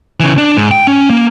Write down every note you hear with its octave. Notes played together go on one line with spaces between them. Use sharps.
C#3 E3
D4
G#2
G5
C#4
A#3